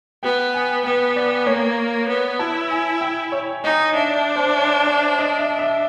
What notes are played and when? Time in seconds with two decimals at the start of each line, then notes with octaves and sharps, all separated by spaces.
0.23 B3 G5
0.54 G#5
0.84 B3 G5
1.16 D5
1.46 A#3 C#5
2.08 B3
2.39 E4 A5
2.71 G#5
3.01 G5
3.32 C#5
3.64 D#4 D#5
3.94 D4 E5
4.15 D5
4.36 C5
4.57 C#5
4.87 D5
5.19 D#5
5.38 E5
5.59 E5